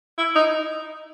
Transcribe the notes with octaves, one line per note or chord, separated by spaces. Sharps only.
E4
D#4